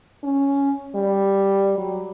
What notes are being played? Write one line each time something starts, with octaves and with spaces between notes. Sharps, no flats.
C#4
G3
F#3